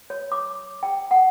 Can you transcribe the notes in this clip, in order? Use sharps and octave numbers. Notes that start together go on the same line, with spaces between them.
C#5
D6
G5
F#5